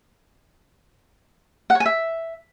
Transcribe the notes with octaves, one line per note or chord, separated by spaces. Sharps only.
F#5
C#5
G#5
E5